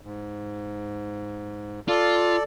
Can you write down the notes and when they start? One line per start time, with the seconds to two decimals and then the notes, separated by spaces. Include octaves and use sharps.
0.01 G#2
1.88 F4 A4 D5